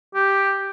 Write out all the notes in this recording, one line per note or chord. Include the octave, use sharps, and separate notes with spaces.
G4